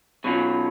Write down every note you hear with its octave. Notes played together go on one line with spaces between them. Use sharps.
B2 F#3 C#4 F4